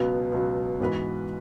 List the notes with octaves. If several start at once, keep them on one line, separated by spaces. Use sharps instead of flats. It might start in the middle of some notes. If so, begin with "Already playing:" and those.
Already playing: C#2 B2 F#3 B3
C#2 B2 F#3 B3
G#2 E3 B3 F#4 B4